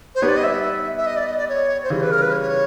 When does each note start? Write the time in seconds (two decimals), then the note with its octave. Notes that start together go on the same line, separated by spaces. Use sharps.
0.15 C5
0.22 G3 B3 D#4 G4 B4 C#5
0.28 D5
0.37 D#5
0.43 E5
0.96 E5
1.06 D#5
1.16 D5
1.27 D#5
1.37 D5
1.49 C#5
1.83 C5
1.90 C#3 E3 G3 C#5
2.01 B4
2.11 A#4
2.22 B4
2.32 C#5